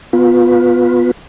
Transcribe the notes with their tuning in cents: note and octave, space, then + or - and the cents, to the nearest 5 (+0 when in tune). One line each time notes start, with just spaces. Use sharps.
B3 +0 F4 +25 B4 +0